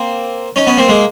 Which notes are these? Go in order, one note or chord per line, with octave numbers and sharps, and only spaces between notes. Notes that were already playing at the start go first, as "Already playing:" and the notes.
Already playing: A#3 C4
C#4 D#4
B3 C#4
A#3 C4
G#3 A#3